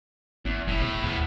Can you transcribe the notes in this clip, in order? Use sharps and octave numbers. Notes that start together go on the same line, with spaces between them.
G#1 E2
F1 A2 E4
B2
D#2 A2 B3